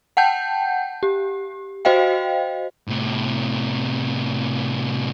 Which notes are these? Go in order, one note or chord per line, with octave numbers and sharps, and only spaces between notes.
F#5 G5 A5 G6
G4
F#4 C5 D#5 F5 G5
A2 C3